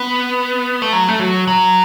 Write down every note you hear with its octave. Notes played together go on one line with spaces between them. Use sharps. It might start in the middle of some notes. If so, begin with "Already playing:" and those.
Already playing: B3
A3
F#3
A3
F#3
F#3